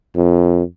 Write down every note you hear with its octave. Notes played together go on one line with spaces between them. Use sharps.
F2